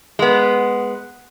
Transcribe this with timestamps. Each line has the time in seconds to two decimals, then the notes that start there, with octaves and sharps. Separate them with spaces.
0.19 G#3 B3